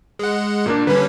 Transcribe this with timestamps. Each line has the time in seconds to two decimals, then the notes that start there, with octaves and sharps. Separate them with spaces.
0.19 G#3 F#5
0.66 A#2 A#3 D4
0.87 D3 G3 C#4 B4